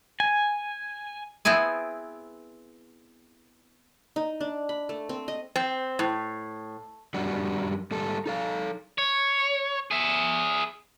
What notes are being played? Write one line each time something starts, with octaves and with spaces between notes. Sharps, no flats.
G#5
B3 C4 E4 G#4 G#5
D#4
D4
B5
A3
C4
D#5
C4
A2
F#2 G3 D4 F#4
G#2 G3 A4
D#4 A4 F5
C#5
G#4 E5